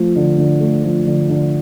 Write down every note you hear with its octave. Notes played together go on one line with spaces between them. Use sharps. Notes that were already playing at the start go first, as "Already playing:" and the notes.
Already playing: F3 A3
D3
D3
A3
F3
D3
D3